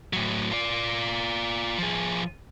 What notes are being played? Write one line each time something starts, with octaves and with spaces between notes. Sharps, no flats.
A2 F#3
F4 D5
F3 G#4